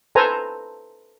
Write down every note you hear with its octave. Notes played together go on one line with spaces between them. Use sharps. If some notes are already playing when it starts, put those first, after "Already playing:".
A4 B4 C5 G#5 A#5